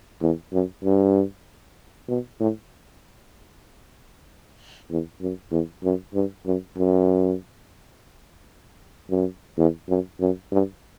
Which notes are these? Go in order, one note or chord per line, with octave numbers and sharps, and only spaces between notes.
E2
F#2
G2
B2
A2
E2
F#2
E2
F#2
G2
F#2
F#2
F#2
E2
F#2
F#2
G2